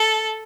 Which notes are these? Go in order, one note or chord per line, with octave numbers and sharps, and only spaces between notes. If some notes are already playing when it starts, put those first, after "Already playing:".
Already playing: A4